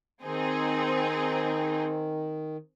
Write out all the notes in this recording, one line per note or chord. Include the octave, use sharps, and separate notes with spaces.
D#3 C4 D#4 G#4